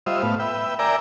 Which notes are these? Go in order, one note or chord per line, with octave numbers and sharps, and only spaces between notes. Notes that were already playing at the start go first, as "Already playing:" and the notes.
G3 F4 C5 D#5 E5
A2 B3 F5
B4 E5 G5
A#4 D5 E5 G5 G#5 A#5